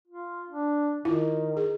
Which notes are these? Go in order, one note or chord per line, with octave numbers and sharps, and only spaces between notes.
F4
D4
D#3 E4 F4
G#4